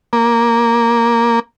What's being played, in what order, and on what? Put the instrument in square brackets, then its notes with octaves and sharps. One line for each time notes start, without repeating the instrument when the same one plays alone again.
[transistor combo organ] A#3